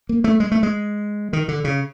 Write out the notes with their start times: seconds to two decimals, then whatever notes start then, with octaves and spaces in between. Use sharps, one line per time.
0.09 A#3
0.24 A3
0.40 G#3
0.52 A3
0.63 G#3
1.33 D#3
1.48 D3
1.64 C#3